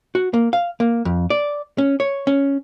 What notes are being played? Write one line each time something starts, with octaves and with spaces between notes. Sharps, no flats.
F#4
A#3
F5
A#3
F2
D5
C#4
C#5
C#4